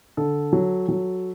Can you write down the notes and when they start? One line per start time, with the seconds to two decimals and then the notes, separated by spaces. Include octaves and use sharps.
0.17 D3 A4
0.53 F#3
0.89 F#3